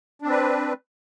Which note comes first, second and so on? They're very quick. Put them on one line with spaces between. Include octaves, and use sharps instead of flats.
D4 C4 B4